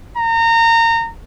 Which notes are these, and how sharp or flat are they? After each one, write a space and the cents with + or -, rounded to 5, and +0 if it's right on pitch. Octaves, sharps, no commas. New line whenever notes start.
A#5 -25